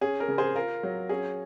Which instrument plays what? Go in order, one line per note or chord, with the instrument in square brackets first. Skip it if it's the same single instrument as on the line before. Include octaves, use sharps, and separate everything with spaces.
[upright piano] C#4 G#4
A#4
C#3
G#4 C5
F4 A#4
F#3
C#4 G#4